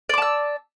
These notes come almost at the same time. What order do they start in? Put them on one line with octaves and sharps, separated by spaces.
D5 D6 A5 E6